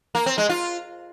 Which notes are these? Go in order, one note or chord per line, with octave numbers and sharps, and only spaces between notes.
A#3
C4
G#3
F4